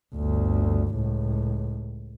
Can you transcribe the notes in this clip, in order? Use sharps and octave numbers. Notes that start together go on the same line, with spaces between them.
G1 D2
C#2 A2